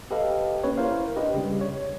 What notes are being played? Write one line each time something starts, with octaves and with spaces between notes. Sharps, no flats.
G4 A4 B4 D#5 F5
A#3 C#4 B4 C#5
E4 A#4 C5 F5
D4 G4 B4 D#5
C#3 G3
C#5